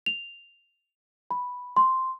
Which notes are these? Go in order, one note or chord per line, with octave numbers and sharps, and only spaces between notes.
F7
B5
C6